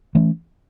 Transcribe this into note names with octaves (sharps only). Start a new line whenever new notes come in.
E3 A3 C#4